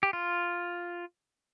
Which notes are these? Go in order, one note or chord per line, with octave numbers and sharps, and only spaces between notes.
G4
F4